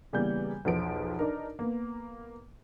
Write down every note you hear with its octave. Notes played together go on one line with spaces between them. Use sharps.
C#3 E3 G3 A#3 B3 G6
B1 E2 F3 D7
D4 D#4 A#4
A#3 B3